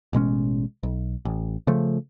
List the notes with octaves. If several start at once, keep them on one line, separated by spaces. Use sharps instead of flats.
A1 B2 G#3 C#4
B1
A1
C#3 F3 A3